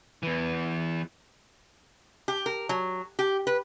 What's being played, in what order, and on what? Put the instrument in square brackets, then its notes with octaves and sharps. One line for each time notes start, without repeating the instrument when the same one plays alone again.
[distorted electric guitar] E2 E3
[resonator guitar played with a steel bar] G4
A#4
F#3
G4
B4